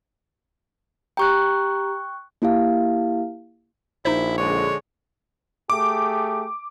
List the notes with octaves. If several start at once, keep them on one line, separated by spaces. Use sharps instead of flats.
G4 G5 A#5 C#6 F#6
A#3 E4 G4 F5
A#1 D#4 E4 C5
D3 G#3 C#5
A3 G4 G#4 D6